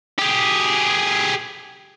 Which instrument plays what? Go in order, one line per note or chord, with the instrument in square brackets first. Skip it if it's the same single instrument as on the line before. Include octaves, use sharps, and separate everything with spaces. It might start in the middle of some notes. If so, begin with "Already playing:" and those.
[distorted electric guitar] G4 G#4